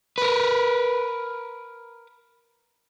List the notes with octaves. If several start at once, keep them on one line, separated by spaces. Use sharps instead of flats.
A#4 B4